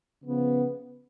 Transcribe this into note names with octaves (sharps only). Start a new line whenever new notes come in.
C#3 F3 B3